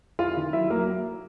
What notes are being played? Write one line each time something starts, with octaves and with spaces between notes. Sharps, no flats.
E4 F4 F5
D#3
F#3 E4 E5
F#3 A#3 A#4